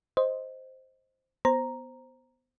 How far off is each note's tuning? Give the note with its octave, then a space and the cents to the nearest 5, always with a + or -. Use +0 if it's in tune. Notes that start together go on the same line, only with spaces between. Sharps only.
C5 +0 D#5 +5
B3 +0 C5 +0 A#5 +0